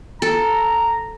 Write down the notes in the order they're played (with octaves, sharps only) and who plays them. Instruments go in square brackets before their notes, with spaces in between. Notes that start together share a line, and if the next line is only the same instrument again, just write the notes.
[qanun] A4 [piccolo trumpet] A#5